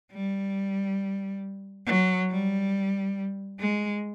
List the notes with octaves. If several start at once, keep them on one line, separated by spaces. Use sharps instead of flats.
G3
F#3
G3
G#3